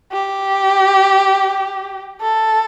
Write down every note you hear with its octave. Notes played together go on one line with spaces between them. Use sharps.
G4
A4